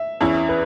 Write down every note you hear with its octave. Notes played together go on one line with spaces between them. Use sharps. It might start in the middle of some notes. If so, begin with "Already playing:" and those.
Already playing: E5
E2 E3 C#4 E4
B4